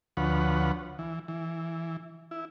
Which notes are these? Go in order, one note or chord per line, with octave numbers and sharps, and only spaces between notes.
D2 F3 B4 C#5 F#5
E3
E3
E4